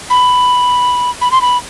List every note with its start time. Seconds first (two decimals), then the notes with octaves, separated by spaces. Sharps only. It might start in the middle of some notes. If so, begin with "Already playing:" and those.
0.10 B5
1.21 B5
1.32 C6
1.41 B5